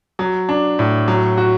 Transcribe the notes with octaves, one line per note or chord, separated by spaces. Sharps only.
F#3
D4
A2
F#3
F#4